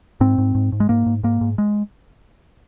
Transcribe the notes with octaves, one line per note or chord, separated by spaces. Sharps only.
G#2 C4
G#2
G#2
G#2
G#3
G#2 A#3
G#2
G#2 A#3
G#2
G#3